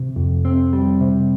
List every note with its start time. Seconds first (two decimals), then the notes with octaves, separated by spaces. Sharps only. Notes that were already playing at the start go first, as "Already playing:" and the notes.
Already playing: C3
0.16 F2
0.45 C4
0.73 G3
1.01 C3